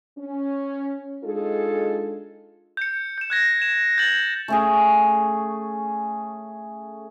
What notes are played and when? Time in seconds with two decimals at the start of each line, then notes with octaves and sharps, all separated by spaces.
0.18 C#4
1.24 G#3 D4 D#4 F4 G#4 A4
2.77 G6 C#7
3.18 G6 E7
3.30 F#6 G#6 A#6
3.62 E7
3.98 G6 A6 F#7
4.48 A3 C#4 G#4